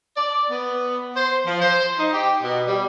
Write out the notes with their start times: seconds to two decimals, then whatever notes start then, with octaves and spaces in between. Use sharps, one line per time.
0.17 D5
0.50 B3
1.16 C5
1.47 F3
1.62 C5
1.99 D#4
2.14 G4
2.43 B2
2.67 G3